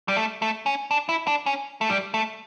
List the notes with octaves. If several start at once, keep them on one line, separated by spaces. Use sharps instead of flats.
G3
A3
A3
C#4
D4
E4
D4
C#4
A3
G3
A3